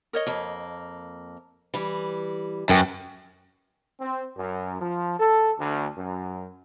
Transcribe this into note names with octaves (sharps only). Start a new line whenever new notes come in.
A#4 C#5 D#5
F2 A#3
E3 G3
F#2 A#4 B4 G5
C4
F#2
F3
A4
D2
F#2